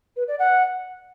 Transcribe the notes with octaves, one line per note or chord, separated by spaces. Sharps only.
B4
D5
F#5